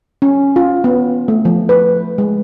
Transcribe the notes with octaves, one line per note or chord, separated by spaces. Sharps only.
C#4
F4
B3
A3
F3
B4
G#3